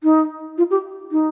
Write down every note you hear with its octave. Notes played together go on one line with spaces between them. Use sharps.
D#4
F4
G4
D#4